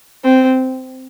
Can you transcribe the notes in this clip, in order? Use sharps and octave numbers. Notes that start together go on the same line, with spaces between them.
C4